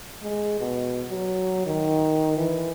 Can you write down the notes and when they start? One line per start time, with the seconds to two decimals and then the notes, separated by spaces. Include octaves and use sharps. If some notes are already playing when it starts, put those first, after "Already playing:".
0.23 G#3
0.60 B2
1.10 F#3
1.66 D#3
2.37 E3